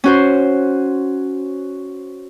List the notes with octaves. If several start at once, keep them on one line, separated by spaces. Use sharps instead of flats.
C#4 F#4 C5